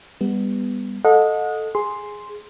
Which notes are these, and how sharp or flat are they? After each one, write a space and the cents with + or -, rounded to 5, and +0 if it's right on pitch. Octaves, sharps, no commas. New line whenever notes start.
G3 +30 B3 +0
A4 +0 D#5 +0 F#5 -35
G#4 +0 C6 +0